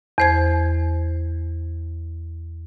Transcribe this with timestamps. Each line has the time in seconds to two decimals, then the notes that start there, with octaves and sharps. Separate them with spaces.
0.18 E2 C5 G#6